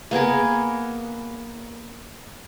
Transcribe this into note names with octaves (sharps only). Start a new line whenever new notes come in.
A#3 B3 G#4 A#4